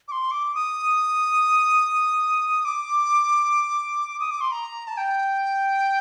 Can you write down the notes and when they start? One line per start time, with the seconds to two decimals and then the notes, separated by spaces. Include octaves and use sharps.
0.08 D6
0.12 C6
0.31 D6
0.55 D#6
2.65 D6
4.20 D#6
4.31 D6
4.41 C6
4.52 A#5
4.88 A5
4.97 G5